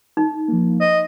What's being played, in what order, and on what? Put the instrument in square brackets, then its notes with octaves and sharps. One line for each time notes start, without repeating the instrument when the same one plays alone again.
[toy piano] D#4
[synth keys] F3 A#3
[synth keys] C5 [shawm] D#5